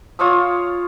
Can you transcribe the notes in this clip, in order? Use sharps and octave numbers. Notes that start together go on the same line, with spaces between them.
F4 C#5 D#6 E6